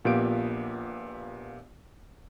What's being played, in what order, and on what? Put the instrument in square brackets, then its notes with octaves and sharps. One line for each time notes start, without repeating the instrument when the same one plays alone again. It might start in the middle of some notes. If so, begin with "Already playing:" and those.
[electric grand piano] A#1 A#2 B3 G4 F5 D7